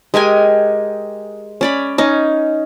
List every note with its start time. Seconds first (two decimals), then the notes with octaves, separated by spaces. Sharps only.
0.14 G#3 G4 A#4 G#5
1.61 C#4 D5 B5
1.98 C#4 D#4